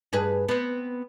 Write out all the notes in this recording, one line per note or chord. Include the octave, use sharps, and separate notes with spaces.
G2 G#4 B4
B3 C4